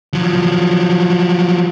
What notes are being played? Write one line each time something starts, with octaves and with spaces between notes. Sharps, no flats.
F3 F#3